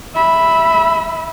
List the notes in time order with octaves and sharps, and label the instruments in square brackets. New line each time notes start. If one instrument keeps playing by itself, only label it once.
[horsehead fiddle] E5 B5